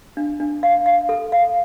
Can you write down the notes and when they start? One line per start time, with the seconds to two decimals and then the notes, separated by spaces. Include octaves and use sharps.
0.17 D4
0.40 D4
0.63 F5
0.86 F5
1.09 A4
1.32 F5